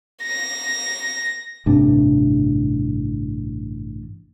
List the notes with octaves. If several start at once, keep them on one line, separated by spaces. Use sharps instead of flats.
A#6
A1 G2 C3 D4